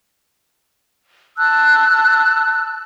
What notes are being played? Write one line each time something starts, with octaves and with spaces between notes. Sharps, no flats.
A5 E6 F#6